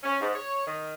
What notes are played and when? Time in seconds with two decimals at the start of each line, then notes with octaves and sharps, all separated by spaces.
0.03 C#4
0.21 G#2
0.35 C#5
0.67 D#3